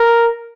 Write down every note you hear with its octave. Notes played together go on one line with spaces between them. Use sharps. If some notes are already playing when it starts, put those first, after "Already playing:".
Already playing: A#4